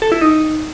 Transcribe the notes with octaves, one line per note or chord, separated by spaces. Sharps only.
A4
E4
D#4